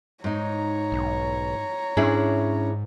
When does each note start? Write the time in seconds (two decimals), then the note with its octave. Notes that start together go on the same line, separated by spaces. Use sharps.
0.24 G#2 D#4 C#5 A#5
0.92 B1
1.97 G#2 C#4 D4 E4 G#4